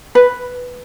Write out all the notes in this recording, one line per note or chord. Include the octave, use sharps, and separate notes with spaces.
B4